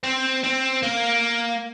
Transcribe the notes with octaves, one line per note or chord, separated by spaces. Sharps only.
C4
C4
A#3